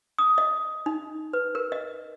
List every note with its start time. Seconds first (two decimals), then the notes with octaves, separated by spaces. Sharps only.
0.18 D#6
0.38 D#5
0.86 D#4
1.33 B4
1.55 A#4
1.72 D#5